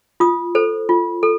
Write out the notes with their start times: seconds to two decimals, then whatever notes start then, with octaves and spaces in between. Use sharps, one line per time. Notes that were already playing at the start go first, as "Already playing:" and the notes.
0.20 F4 D#6
0.55 A4 C5
0.89 F4
1.23 A4